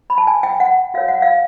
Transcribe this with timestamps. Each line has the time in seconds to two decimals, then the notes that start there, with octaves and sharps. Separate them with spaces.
0.10 B5
0.18 A5
0.27 G#5
0.43 G5
0.60 F#5
0.94 F#4 A#4 C#5 F5
1.08 F#5
1.22 F5